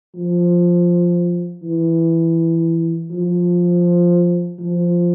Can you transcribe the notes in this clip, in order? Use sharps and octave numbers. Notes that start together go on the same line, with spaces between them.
F3
E3
F3
F3